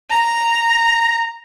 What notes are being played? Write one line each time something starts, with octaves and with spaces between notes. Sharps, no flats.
A#5